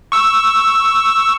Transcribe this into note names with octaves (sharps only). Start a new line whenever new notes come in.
C#6 E6